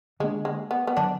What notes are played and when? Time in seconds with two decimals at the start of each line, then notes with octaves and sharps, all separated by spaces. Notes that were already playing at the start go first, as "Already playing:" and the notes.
0.20 D3 F3 G#3 A#3 D4
0.45 G#3
0.71 B3
0.87 B3
0.97 D3 F#3 D4